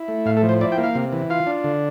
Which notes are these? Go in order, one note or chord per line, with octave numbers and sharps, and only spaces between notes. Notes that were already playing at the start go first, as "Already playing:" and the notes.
Already playing: E4
A3
A2 F5
A4
F3
C5
E4 D5
G5
A#3
F5
C3
E3
F4 F5
D4
D3